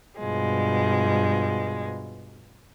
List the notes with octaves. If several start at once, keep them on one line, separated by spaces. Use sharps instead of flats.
G2 B2 F3 G#3